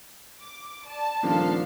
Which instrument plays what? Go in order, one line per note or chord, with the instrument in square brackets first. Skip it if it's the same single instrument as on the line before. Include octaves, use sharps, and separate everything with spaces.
[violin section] D6
D5 A5
[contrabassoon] D#1 [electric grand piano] F3 A#3 D4 [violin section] A4 F5